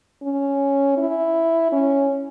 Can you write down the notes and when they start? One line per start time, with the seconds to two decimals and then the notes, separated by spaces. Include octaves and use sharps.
0.23 C#4
0.98 E4
1.72 C#4